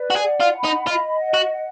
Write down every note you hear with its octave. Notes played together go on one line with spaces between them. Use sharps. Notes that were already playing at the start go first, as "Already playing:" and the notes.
Already playing: B4 D5
F#4
G#4
F#5
F4
B5
D#4
F4 D#5
F#5
F#4
F#5